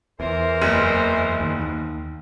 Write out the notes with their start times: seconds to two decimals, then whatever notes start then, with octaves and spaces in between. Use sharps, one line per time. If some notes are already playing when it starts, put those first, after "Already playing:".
0.20 E2 E3 A#4 C5
0.62 F#1
1.40 D#2